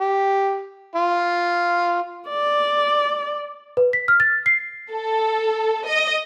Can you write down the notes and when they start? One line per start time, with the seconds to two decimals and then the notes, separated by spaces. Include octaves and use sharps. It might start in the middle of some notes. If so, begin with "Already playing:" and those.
0.01 G4
0.96 F4
2.28 D5
3.77 B4
3.93 B6
4.08 F6
4.20 A6
4.46 C7
4.92 A4
5.85 D#5